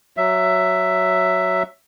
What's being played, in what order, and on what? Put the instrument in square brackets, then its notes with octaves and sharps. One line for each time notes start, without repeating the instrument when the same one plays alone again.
[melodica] F#3 E5